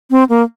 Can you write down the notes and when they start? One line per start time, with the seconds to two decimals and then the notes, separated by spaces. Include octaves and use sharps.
0.11 C4
0.29 A#3